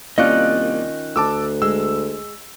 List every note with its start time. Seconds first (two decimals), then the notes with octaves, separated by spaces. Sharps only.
0.18 C2 D#3 A#3 C#4 F4 D5 D#5 F#6
1.16 D2 A5 D6 E6
1.62 G#3 E6